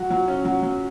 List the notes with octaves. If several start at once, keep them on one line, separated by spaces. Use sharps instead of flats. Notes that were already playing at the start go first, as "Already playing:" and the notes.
Already playing: F#3 F#4
F#3
C#4
F#3
F#3